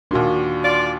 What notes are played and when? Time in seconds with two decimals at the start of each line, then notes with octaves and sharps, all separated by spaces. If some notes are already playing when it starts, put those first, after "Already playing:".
0.11 D#2 A#2 D4 F#4
0.64 F4 D5